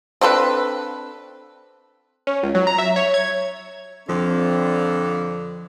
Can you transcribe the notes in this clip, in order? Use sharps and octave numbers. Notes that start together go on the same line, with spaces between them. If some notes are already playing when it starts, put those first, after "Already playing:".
C4 D4 A4 B4
C#4
C#2
F#3
A#5
E5
C#5
G#6
F2 D3 F3 C4